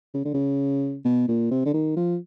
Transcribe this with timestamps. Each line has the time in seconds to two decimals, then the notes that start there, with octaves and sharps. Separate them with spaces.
0.14 C#3
0.25 D3
0.34 C#3
1.05 B2
1.28 A#2
1.51 C3
1.65 D3
1.74 D#3
1.96 F3